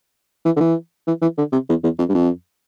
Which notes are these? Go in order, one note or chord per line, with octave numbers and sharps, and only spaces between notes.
E3
D3
E3
E3
E3
D3
C3
E2
E2
F2
G2
F2